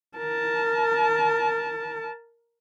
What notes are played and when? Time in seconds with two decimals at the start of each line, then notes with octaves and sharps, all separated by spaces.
0.17 A#4 A5